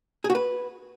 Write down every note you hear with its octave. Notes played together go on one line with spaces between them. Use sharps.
G#4
F#4
B4